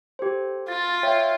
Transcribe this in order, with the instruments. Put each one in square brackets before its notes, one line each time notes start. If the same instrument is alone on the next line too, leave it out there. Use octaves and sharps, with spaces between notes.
[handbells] G4 A4 C5
[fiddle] F4 [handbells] A6
[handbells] C#5 E5 G5